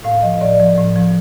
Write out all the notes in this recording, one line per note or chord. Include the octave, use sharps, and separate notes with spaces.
A2 F5
F3 D#5
A2 D5
F3
A2
F3